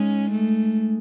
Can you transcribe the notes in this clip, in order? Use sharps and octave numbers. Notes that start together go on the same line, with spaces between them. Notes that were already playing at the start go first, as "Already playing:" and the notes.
Already playing: G#3 C#4 D#4 G#4
A3